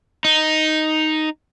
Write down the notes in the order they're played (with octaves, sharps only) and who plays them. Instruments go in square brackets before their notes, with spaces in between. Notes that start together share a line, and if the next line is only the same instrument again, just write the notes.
[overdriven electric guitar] D#4